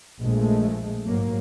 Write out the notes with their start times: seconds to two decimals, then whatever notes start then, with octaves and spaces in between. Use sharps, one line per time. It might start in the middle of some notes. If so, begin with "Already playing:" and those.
0.20 A#1 G#3 A3
1.06 G#2 F#3 A#3